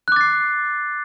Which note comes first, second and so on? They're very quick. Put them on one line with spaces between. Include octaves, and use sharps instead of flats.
F#6 D6 A6 C7